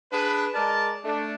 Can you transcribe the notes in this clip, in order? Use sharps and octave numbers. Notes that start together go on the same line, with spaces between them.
D4 G#4 B4
G#3 A#4 D5 A5
A3 D4